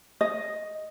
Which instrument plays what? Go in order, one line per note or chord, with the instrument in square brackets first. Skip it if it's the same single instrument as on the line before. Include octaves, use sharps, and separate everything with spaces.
[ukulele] D#5